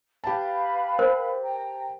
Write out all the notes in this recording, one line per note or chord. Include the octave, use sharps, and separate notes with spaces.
G4 B4 F5 A5 B5
A#4 C5
G5 A#5